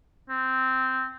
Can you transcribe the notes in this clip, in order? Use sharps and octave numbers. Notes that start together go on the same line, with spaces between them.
C4